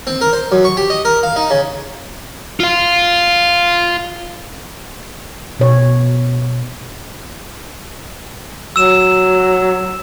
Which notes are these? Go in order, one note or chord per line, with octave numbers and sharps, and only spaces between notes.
C4
A#4
C5
F#2
C#6
G4
D#5
A#4
F5
D#4
C#3
F4 F5
B2 C#5
F#3 E6 E7